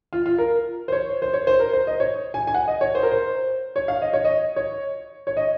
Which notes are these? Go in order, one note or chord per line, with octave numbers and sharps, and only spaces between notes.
F4
F4
A#4
C5
C#5
C5
C#5
C5
A#4
C5
D#5
C#5
G#5
G#5
F#5
D#5
C#5
C5
A#4
C5
C#5
F5
D#5
C#5
D#5
C#5
C#5
D#5